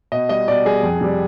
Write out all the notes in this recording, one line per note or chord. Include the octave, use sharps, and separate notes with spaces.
B2 D#5
G3 D#5
B2 D5
G3 G#4
F2
C3 G3